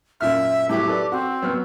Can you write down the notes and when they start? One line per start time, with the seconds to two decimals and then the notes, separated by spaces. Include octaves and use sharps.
0.21 F#2 A#2 E5 F6
0.69 A2 F#3 G4
0.88 A4 B4 D5
1.12 C4 F#4
1.42 F#3 B3 F6